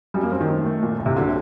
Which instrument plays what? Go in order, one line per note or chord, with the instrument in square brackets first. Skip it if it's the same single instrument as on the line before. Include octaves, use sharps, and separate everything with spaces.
[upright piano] F#2 [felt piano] G3
[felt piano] A#3
[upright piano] F#2 [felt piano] C4
[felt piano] D#3
[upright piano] A3
A3
A#2
C2
[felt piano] C3
[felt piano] D3 [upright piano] F#3